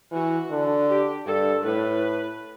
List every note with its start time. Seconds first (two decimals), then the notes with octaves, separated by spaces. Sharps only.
0.12 E3 F#4
0.51 D3
0.88 G4
1.26 G2 A4
1.64 A2 B4